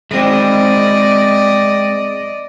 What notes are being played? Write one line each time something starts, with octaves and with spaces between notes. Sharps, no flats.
G#3 C4 D5 D#5